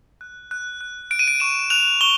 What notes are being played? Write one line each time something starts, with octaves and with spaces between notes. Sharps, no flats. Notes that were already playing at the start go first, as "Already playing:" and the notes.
F#6
F#6
F#6
F#6 D7
D#7
D7
C#6 E7
F#6 F7
C#6 G7